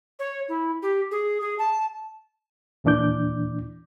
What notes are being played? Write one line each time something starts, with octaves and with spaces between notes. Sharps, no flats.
C#5
E4
G4
G#4
G#4
A5
D#2 A#2 E3 D4 D6 G6